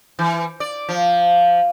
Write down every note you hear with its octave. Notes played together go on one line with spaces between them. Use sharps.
E3
D5
F3